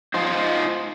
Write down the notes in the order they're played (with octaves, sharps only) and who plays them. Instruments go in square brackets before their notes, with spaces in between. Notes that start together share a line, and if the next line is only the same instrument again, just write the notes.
[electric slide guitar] D#4 F4 C5